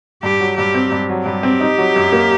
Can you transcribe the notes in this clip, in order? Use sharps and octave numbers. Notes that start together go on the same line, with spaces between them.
G2 G4
F#3
G2 G4
C4
G2
F#3
G2 G4
C4
D#4
F#3
F#2
A#3